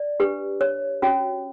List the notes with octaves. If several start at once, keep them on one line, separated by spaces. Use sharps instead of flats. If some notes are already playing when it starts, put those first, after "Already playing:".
Already playing: D5
D4 G4 B4
C#5
C#4 F#4 C#5